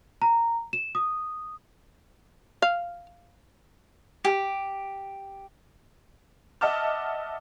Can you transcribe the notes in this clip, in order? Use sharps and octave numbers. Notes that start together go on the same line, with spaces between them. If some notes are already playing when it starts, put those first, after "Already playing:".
A#5
E7
D#6
F5
G4
D#5 E5 F#5 A5 D6 F6